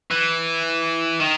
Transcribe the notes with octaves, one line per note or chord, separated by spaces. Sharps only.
E3
D#3